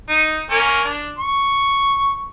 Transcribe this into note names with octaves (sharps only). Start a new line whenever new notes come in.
D#4
A#3 C#4 A#4
D4
C#6